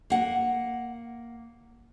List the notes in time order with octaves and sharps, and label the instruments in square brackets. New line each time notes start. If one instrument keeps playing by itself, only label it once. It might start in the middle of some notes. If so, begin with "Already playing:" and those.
[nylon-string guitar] A#3 F#5